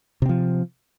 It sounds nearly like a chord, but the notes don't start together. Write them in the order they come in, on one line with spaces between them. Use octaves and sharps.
C3 C4 F3